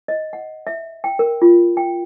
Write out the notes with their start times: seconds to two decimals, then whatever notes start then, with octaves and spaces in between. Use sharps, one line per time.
0.08 D#5
0.33 F#5
0.67 E5
1.04 G5
1.19 A#4
1.42 F4
1.77 G5